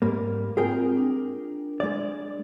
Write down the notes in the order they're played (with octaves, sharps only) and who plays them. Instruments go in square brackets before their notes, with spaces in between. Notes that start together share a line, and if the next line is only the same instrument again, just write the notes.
[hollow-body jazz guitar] G#2 G3 A#3
[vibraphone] C4 F4 [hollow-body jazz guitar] G#4 A#4 G5
[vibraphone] D4
[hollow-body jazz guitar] G#3 D5